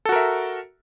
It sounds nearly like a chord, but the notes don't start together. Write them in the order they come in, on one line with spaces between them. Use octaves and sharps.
A4 F#4 A#4 E5